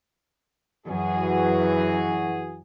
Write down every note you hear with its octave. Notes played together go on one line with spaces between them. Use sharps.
F#2 E3 F#4 G#4